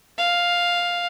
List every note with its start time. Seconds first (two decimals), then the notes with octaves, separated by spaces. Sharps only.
0.18 F5